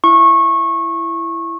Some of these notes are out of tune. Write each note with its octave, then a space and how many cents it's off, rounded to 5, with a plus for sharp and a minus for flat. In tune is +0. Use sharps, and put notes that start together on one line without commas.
E4 +15 C#6 -20